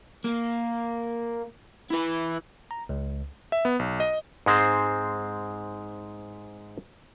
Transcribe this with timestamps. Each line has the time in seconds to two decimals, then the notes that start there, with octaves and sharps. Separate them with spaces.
0.24 A#3
1.91 E4 B4
2.71 A#5
2.89 C#2
3.52 E5
3.65 B3
3.79 B1
4.00 D#5
4.46 G#2 G#3 C4 C5